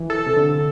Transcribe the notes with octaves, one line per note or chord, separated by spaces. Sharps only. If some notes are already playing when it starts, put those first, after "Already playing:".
Already playing: E3
A4
C3
D3